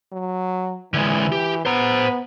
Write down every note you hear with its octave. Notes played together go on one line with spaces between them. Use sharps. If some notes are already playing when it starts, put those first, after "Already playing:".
F#3
D3 E3 G#3
G4
B3 C5 A#5